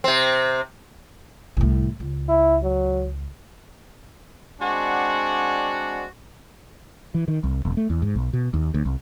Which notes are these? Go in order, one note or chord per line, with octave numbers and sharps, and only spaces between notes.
C3 C4
C2 A2
C#2
E4
F#3
G#3 C4 D4 F#4 D5 F#5
E3
D#3
C2
E1
A3
E2
G#2
B1
B2
D#2
D2
C2